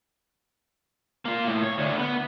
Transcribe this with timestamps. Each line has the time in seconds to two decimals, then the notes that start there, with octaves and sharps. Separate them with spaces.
1.25 A#3 F4
1.47 A2
1.63 C#5
1.78 D2 D3
1.99 B3